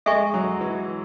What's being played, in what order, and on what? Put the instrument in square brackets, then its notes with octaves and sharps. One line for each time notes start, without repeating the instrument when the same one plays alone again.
[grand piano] G#3 [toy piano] A4 E5 G#5 C#6
[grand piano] F#3
E3